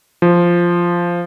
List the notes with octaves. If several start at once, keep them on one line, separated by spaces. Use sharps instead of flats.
F3